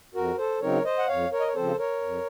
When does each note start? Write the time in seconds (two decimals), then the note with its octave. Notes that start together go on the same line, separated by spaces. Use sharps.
0.15 F2 F#4 A#4
0.38 A4 C5
0.62 C#3 F#3 C4 D#4 A#4 C#5
0.85 C5 D#5
0.99 F#5
1.08 F2 C#5 F5
1.32 A#4 C#5
1.40 D#5
1.48 C#5
1.55 C#3 F3 C4 A4 C5
1.78 A#4 C#5
2.02 F2